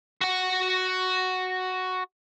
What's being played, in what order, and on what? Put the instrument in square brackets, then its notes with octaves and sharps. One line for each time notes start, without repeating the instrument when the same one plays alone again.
[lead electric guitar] F#4 F#5